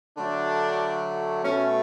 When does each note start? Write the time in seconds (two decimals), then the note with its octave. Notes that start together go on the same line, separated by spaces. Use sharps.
0.16 D3 F#3 A3 D4
1.43 B2 A3 C#4